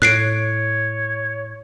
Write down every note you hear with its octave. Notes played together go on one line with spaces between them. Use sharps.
A2 C#5 F#6 C7 D7